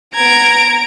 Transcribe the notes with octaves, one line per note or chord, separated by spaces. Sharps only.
B3 A#5 G#6 D7